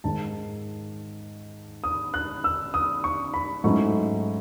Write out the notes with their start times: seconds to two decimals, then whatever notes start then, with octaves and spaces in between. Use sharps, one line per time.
0.04 G#2 D#3 G#3 D#4 A5
1.84 D#6
2.14 F#6
2.44 E6
2.74 D#6
3.04 C#6
3.34 B5
3.64 G#2 F#3 A3 C#4 E4 C#6